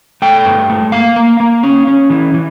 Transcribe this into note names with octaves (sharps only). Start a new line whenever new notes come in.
A3 G5
G2
A3
A#3 F5
A#3
A#3
C#4
C#4
E3
E3